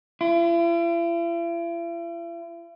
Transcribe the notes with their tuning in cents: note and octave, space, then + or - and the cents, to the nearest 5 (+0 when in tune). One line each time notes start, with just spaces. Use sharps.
E4 +45